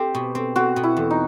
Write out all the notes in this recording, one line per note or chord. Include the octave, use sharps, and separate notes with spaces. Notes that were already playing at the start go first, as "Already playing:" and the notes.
Already playing: C4 G4
B2
C4
C4 F#4
B2
E4
E2
D#4